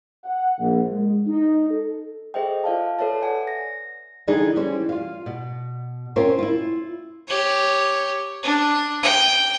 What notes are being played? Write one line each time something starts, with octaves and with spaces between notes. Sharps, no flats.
F#5
A#1
G#3
D#4
A4
G#4 A4 C5 D#5 E5 G5
F4 D5 F5 A5
A4 B4 C#5 E5 A5
D5 F#5 G#5
A#6
D3 E3 G3 D#4 G#4
E3 G3 C#4 C5
F4 F5
B2
C4 C#4 F4 A#4 C5 C#5
E4 F4
G4 C#5
D4
G5